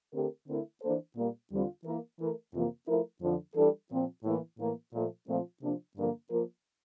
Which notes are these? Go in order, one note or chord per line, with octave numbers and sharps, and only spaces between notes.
D3 A3 C4 G4 A#4
D3 A3 C4 E4 A#4
E3 A#3 D4 A4 C5
A#2 G3 A#3
E2 D3 G3 C4 F4
E3 A#3 E4 A#4
E3 A3 E4 A#4
F2 C3 E3 A#3 F4
F3 A3 E4 A#4
F2 D3 F3
E3 G3 D4 A4
A#2 F3 C4
A2 E3 A#3 E4
A2 E3 A#3
A#2 F3 A3
A#2 F3 A3 C4 F4
C3 F3 A#3 D4
G2 D3 F3 A#3
F3 A#3 F4 A#4